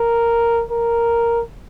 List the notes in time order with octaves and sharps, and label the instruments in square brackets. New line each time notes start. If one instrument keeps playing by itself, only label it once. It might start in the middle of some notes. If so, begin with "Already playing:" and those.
Already playing: [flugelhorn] A#4
A#4